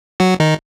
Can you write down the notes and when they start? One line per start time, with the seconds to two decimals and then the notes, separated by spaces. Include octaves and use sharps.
0.20 F#3 F#4
0.40 D#3 D#4